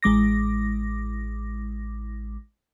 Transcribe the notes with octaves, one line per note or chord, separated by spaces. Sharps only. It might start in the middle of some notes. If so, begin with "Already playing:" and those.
A1 G#3 D6 A#6